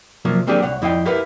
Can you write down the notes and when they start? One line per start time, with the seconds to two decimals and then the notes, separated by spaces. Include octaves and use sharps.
0.25 C3 F3 F#3 A#3
0.47 F#3 A#3 C4 D4 G4 G#4
0.62 C2 C#5 F#5
0.82 F2 E4 D#5 F5 G5
1.06 E4 G4 A#4 B4 F5